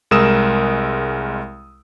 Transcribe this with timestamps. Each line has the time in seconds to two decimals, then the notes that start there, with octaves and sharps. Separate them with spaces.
0.11 C2 G#3 A#4 D#6 E6 E7